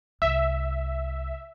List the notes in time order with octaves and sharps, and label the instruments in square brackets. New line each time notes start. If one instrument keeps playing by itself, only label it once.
[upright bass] C2 [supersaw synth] E5